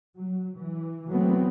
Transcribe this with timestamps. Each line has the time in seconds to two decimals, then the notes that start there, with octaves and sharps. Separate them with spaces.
0.16 F#3
0.58 E3
1.10 E3 F#3 A3 B3 C4